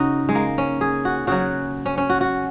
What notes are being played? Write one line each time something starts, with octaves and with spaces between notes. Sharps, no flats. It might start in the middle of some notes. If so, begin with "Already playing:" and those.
Already playing: C#3 D#4 F#4
G#3
A#3
C#4
G#4
F#4
C#3 F#3 F#4
C#4
C#4
F#4
F#4